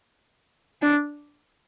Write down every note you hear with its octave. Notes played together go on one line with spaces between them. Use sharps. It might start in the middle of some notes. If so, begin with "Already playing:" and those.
D4